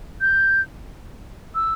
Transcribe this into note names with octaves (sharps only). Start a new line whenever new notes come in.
G6
E6